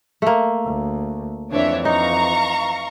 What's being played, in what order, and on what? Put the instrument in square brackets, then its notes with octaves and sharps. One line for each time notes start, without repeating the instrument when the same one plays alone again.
[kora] A3 A#3
[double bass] D2
[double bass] F2 E3 [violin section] D4 C#5 E5
[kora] D#4 [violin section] F5 A#5 C#6